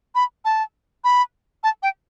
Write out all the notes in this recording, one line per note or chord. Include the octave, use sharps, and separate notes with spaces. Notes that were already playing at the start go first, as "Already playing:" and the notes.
B5
A5
B5
A5
G5